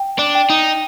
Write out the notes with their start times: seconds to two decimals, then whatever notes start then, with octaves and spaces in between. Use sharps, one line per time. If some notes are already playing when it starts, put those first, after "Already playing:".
Already playing: G5
0.19 D4
0.35 G5
0.50 D#4